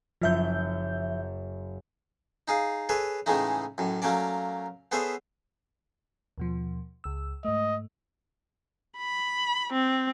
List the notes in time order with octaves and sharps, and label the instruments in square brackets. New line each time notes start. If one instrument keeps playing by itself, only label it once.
[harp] F#1 F#2 F6 [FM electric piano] F3 E5 G6
[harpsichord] D#4 G#4 F5
G#4 A4 B4 C#5
A2 C#3 E3 G#3 A3 D#4
F#2 A2
F#3 A3 A#3 C#4 D5
B3 G#4 A4 C5 C#5 E5
[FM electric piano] D#2 B2 F3
C#2 E6
[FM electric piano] G#2 A3 [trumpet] D#5
[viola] B5
C4